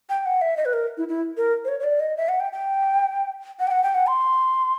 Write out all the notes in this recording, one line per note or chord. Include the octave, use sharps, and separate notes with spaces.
G5
F#5
E5
D#5
B4
A#4
E4
E4
A#4
C5
C#5
C#5
D5
D#5
E5
F#5
G5
G5
F#5
G5
F#5
G5
F#5
C6